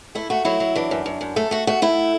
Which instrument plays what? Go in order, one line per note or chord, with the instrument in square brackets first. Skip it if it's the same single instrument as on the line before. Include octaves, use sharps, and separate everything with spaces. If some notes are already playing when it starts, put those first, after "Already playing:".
[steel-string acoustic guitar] A3 E4
A3 F#4
F#3 E4
F#3
E3 D4
F#2
F#2
F#2
A3 A4
A3 F#4
A3 F#4
A3 E4